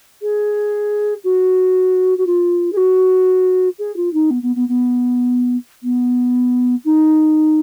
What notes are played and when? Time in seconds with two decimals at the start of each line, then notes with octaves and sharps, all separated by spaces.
0.22 G#4
1.24 F#4
2.18 F#4
2.27 F4
2.72 G#4
2.77 F#4
3.79 G#4
3.96 F4
4.13 D#4
4.30 B3
4.43 B3
4.56 B3
4.69 B3
5.83 B3
6.85 D#4